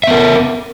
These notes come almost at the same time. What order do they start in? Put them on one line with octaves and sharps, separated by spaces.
E5 B3 A#4